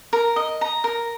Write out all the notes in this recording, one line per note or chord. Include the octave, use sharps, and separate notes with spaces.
A#4
D#5
A#5
A#4